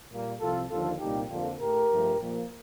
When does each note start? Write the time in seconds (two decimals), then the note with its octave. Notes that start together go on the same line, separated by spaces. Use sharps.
0.10 A#2 G3 A#3
0.40 C2 C3 F3 F4 A4
0.70 D#2 D3 F3 F4 A4
0.99 C2 A#2 G3 A#3 D#4 G4
1.29 F2 D3 F3 A#3 D4 F4
1.59 A2 A3 G4 A#4
1.89 G2 F3 A3
2.19 A#2 F3 A#3